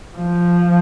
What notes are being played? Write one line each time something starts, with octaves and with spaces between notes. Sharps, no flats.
F3